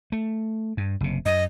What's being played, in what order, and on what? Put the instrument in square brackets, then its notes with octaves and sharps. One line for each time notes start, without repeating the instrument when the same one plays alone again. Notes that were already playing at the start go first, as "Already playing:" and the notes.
[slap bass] A3
G2
F#1 C3
[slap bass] F#2 [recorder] D#5